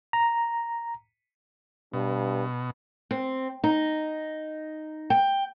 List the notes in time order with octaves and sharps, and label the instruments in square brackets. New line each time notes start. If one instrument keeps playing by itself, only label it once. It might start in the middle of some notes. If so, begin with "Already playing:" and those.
[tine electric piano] A#5
[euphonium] G2 [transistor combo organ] B2
[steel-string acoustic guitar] C4
D#4
G5